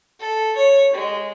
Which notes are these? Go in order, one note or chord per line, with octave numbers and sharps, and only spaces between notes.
A4
C#5
G#3